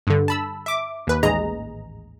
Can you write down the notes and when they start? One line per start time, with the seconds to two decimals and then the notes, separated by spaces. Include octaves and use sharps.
0.07 G2 D3
0.28 A5 B5 E6
0.66 E5 D6
1.07 D#2 B4
1.23 A1 D#2 G#2 G#4 D#5 A#5